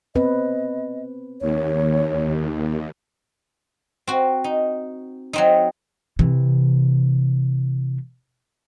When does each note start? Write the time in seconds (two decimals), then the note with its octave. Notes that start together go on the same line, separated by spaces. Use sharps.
0.15 B3 C4 B4 D#5
1.41 D#2 C#5
4.07 C4 F#4
4.44 D#4
5.33 F#3 C4 D#4
6.19 C3 E3